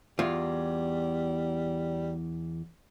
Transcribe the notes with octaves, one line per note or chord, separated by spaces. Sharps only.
E2 G3 F4